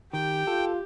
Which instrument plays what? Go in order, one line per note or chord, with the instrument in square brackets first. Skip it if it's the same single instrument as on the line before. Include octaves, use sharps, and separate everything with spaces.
[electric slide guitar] D#3 [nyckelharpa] G4 [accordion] G5
[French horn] F4 [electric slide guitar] A4